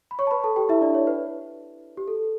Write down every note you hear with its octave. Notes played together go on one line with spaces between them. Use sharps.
B5
C#5 C#6
A5
B4 B5
A4 A5
G4 G5
E4 E5
D4 D5
C#5
B4
G4
A4